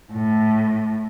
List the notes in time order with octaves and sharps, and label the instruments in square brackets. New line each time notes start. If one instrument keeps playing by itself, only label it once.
[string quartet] A2